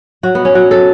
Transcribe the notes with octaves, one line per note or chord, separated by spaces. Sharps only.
F#3 F#4
B2 B3
C#4
F#3 F#4
F#3 A4